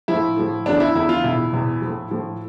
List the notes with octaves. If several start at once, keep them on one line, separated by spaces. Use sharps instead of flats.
A2 F3 E4
A2 F3
E2 D3 F3 D4
E4
E2 D3 F3 E4
F4
E2 B2 E4
E2 B2
A2 F3
A2 F3